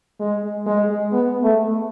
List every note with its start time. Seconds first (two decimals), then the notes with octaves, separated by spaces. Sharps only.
0.20 G#3
0.66 G#3
1.13 B3
1.43 A3